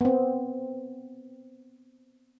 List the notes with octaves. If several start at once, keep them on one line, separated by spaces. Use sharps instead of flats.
B3 C4